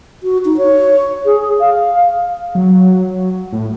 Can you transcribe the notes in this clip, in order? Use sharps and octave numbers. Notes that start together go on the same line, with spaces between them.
F#4
D#4
C#5
G#4
F5
F#3
A2